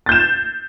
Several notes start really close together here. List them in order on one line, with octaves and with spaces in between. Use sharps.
A6 G6 E7